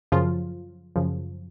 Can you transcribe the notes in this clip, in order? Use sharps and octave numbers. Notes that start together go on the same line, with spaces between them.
F#2 C#3 F3 F4
F#2 C#3 F3